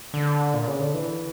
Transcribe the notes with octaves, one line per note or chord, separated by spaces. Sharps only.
D3
A#2
C#3
D3
E3